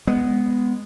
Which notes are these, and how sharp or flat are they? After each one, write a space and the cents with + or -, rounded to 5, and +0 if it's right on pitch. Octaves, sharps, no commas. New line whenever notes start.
G#3 -5 B3 +0